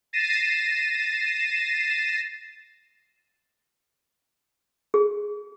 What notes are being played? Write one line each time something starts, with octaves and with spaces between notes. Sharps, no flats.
A6 A#6 C7 D#7 E7
G#4